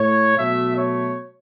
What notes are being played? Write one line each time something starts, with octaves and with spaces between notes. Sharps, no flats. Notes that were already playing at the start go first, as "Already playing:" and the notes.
Already playing: A2 A3 C#5
B2 F#3 A3 E5
C#5